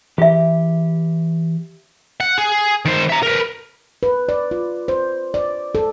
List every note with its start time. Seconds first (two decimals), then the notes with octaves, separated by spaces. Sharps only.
0.18 E3 G4 G#4 E5
2.20 F#5
2.38 G#4
2.85 D#3 C5
3.10 E5 A#5
3.23 A#4 B4
4.03 B4
4.29 D5
4.51 F4
4.88 C5
5.34 D5
5.75 A4